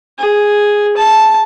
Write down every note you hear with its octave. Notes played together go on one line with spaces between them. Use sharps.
G#4
A5